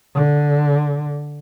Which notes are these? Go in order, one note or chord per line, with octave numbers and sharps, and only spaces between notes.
D3